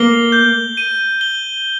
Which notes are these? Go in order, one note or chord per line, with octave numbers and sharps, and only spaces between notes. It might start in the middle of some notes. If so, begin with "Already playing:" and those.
Already playing: A#3 G7
G6
D#7
G7